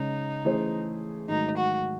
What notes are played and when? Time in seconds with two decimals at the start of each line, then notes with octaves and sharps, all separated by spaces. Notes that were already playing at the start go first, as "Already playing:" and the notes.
Already playing: C#3 G#3 C#4 D#4
0.44 E3 A3 C#4 G#4 C5
1.28 G#2 D#3 F#3 A3 D#4
1.57 F#4